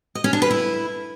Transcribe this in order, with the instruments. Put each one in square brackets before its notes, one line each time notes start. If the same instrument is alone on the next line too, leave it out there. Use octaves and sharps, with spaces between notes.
[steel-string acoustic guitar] D#5
C#4
D4
B4
E4